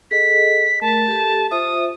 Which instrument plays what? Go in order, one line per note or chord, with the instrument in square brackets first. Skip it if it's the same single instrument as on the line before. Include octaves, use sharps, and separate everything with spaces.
[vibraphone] G#4 A4 D#5 [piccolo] B6
[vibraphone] A3 A#4 [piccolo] A5
[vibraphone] G4 A4
[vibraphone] F4 C5 E5 [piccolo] D#6